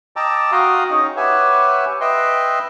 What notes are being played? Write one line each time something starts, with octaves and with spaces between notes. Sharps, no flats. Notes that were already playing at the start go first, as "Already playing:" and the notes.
D#5 G5 A5 A#5 D6 E6
F#4 F5 G5 A#5 C6 D#6
C#4 D#4 G#4 D#5 C#6
G4 B4 C#5 E5 F#5 G#5
B4 D#5 E5 G5 C6